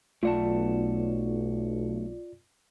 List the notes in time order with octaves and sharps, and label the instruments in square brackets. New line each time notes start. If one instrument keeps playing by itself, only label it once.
[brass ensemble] B1 [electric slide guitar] A3 F#5 A5 [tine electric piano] F4 D5